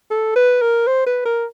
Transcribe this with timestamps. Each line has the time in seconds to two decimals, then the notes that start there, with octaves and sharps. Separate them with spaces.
0.11 A4
0.36 B4
0.62 A#4
0.87 C5
1.07 B4
1.25 A#4